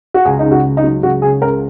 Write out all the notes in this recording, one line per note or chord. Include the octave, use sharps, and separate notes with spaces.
F#4
C#2 G#4
D#4
C#3
F#4
C#2
D#4
F#3
C#2 F#4
C#3 G#4
C#2 A#4